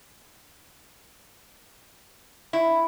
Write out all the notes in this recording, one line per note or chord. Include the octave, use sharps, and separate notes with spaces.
E4